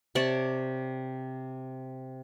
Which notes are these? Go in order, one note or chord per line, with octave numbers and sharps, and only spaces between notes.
C3 C#5 D5 A5